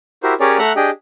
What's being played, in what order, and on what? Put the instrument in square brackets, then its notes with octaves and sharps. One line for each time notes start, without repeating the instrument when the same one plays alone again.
[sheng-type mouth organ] E4 F#4 G4 A#4 C5
C#4 G4 G#4 A#4 C#5 D5
A3 E5 F#5 A#5 F#6
D4 G4 G#4 D#5 G5